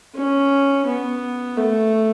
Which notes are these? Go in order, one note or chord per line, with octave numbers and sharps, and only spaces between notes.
C#4
B3
A3